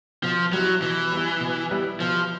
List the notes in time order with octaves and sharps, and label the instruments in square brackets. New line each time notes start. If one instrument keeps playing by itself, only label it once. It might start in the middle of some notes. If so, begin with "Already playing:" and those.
[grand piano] B2 [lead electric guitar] F3
[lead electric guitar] F#3 [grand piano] G3 B3 E4
[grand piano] B2 [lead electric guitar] E3
[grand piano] G3 B3 E4
B2
G3 B3 E4
[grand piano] B2 [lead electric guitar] F3